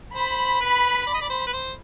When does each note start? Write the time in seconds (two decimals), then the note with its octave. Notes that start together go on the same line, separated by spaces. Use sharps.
0.15 C5 B5
0.61 B4
1.07 D5
1.14 D#5
1.22 D5
1.30 C5
1.47 B4
1.53 C5